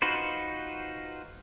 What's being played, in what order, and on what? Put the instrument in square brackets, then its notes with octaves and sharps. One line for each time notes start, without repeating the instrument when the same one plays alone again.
[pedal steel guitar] D#4 F4 F#4 B4 C5